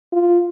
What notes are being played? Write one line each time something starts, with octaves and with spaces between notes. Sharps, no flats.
F4